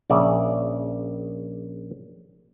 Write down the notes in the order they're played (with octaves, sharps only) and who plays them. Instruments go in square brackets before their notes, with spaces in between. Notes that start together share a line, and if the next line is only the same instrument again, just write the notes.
[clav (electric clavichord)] A#1 C#3 D5 E5